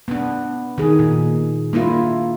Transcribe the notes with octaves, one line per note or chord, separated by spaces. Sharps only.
B3 D4
D#3 G#4
A#2
A#3 D4 E4 F4